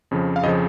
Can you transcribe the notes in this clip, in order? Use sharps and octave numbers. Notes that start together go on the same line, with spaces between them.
F2 C#3 F3
F5
F2 C#3 F3 D#5